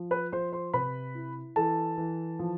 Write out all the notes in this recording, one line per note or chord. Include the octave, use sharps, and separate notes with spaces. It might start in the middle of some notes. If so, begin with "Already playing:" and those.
Already playing: F3
B4 B5
F3 C5 C6
C5 C6
C3 B4 B5
E4
E3 A4 A5
E3
F3